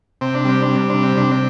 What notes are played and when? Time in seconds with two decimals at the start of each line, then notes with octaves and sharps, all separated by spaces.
0.21 C3 C4
0.35 D4
0.45 G3 C4
0.62 D4
0.69 G3
0.76 C4
0.90 C3 D4
1.03 C4
1.17 C3 D4
1.31 C4